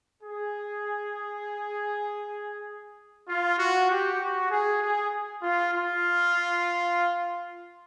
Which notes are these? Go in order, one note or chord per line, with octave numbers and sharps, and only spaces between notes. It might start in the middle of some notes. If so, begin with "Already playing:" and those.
G#4
F4
F#4
G4
F#4
G#4
G#4
F4
F4